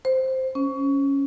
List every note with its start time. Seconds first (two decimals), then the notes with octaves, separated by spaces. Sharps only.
0.05 C5
0.55 C#4